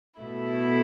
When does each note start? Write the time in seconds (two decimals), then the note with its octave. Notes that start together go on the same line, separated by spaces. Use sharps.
0.18 B2 A3 E4